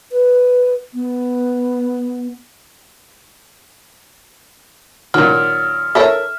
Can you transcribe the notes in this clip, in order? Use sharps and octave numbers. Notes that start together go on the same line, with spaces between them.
B4
B3
A#2 D#3 F#3 F6
A4 A#4 C#5 E5